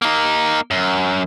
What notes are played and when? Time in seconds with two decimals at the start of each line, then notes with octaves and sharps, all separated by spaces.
0.02 A#3 D#4
0.71 F#2